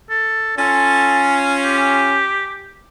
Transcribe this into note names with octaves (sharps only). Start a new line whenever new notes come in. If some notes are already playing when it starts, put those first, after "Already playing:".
A4
C#4 F4 A4
G4